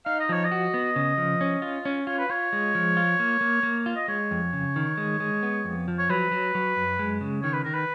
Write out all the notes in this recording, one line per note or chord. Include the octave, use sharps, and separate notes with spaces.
D#4 F5
D#5
F3 C#5
D#5
F#4
B3
C#3
F3
C#4
F4
C#4
F4 C#5
B4
F4 C#5
G#3
F3
F4
A#3
A#3
A#3
F4
D#5
G#3 C#5
F2
C#3
D#3
G#3
G#3
B3
F2
F3
C#5
F#3 B4
F#3
F#3
F#2
G#3
C#3
D#3 C#5
B4
D#3 A#4
B4